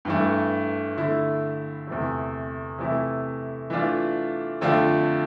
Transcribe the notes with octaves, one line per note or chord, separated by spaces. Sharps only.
G2 E3 A3
D3 A3 E4
E2 C3 E3 A3
C3 E3 A3 E4
E3 A3 D4 F4
F2 D3 A3 D4 F4